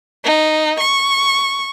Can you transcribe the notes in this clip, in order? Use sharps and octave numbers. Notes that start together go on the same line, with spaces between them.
D#4
C#6